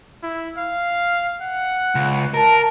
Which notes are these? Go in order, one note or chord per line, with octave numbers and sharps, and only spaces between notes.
E4
F5
F#5
C#2
A#4 A5